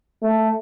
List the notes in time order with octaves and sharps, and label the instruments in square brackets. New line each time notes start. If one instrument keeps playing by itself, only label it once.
[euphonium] A3